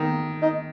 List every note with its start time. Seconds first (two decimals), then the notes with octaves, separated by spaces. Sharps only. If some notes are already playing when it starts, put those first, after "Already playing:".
Already playing: D#3
0.42 D#4